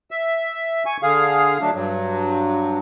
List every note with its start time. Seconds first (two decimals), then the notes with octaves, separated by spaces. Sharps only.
0.11 E5
0.86 G#5 C#6
1.03 D3 G#4 F5
1.61 F#3 A3 D4
1.74 G2 F#3